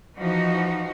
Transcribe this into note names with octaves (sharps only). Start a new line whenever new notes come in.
E3 F3 D#4 F#4